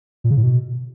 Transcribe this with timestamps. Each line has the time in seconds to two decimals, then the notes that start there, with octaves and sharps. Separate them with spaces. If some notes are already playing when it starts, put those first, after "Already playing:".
0.24 A#2
0.31 C#3
0.37 A2
0.43 B2